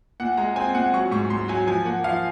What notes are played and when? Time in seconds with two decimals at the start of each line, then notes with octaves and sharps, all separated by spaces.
0.20 A#2 F#5
0.37 G#3 A#5
0.56 C4 G#5
0.74 A#2 F#5
0.94 F#3 C#6
1.11 G#2 C#6
1.30 G#2 C6
1.48 F#3 G#5
1.67 F3 G#5
1.85 A#3 F#5
2.04 F3 F5